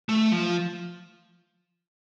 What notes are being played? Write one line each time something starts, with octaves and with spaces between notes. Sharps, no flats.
A3
F3